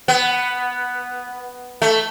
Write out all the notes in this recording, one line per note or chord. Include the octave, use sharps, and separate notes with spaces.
B3
A3